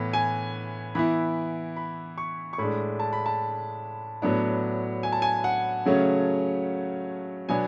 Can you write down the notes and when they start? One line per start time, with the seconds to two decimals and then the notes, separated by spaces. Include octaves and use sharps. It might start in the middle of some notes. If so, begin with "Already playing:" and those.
Already playing: A2 E3 B3
0.13 G#5
0.95 E3 B3 E4 B5
1.76 B5
2.18 C#6
2.53 C#6
2.58 A2 G#3 D4 B5
2.99 A5
3.13 B5
3.26 A5
4.22 A2 F#3 B3 D4
5.03 G#5
5.12 A5
5.22 G#5
5.44 F#5
5.86 C#3 F#3 A3 C#4
7.49 B2 F#3 B3 D4 G#5